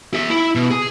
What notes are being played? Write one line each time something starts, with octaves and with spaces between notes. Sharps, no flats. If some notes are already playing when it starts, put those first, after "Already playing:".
G#4 E5
E4
B2
G#4